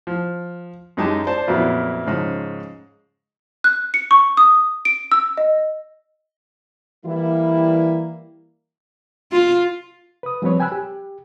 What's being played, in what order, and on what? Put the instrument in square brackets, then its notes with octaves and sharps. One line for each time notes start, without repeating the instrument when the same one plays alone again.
[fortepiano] F3
F#2 G#3 D#4 G4 A5
C5 D5 A5
F2 A#2 F#3 B3 E4
G#2 C#3 F3
[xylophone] F#6
C#7
C#6
D#6
D7
E6
D#5
[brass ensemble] E3 G3 A#3 E4
[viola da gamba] F4
[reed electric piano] B4 D#6
F3 G3 C4 B4 C#5
G5 G#5 B5 E6 F#6
G4